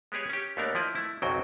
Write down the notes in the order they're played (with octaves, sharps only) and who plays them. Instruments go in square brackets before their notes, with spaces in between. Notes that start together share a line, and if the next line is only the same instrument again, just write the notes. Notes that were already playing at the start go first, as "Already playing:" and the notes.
[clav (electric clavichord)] G#3 B3 G4 G#4 C#5
C#4 G4
D#2 A3 B3 D4 A#4
F3 E4 D5 D#5
A3 E4
B1 F2 C#3 F#3 F#4 G5